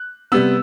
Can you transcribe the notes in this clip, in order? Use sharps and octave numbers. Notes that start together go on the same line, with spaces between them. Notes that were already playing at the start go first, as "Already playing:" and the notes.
Already playing: F#6
C3 G3 B3 E6